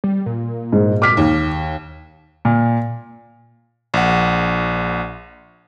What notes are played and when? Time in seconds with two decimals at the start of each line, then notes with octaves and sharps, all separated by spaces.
0.04 G3
0.26 A#2
0.72 G#2
1.02 D6 F6 B6
1.17 D#2
2.45 A#2
3.94 A#1 F#5